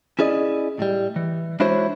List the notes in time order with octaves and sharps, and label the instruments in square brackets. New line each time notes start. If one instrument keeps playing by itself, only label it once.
[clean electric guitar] C#4 E4 G#4 D5 D#5
A2 G3
E3
G#3 D4 E4 F#4 C5 C#5